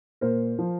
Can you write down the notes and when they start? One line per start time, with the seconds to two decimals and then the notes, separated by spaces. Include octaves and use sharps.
0.21 A#2 A#4 C5
0.58 F3